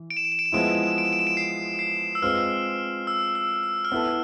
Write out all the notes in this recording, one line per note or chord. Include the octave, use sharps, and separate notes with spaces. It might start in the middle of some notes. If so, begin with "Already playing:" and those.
Already playing: E3
D7
E7
D7
E7
D7
E7
F3 G#3 B3 E4 D7
E7
D7
E7
D7
E7
D7
E7
D7
E7
D7
C7
C7
E6
G#3 C4 F4 B4 F6
E6
E6
E6
F6
B3 E4 A4 E6